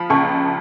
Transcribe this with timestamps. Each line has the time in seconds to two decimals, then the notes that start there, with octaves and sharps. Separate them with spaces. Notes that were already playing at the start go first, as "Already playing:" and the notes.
Already playing: F3 B5
0.10 C#2 A5 C#6